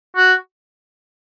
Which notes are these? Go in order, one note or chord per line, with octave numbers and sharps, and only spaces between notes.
F#4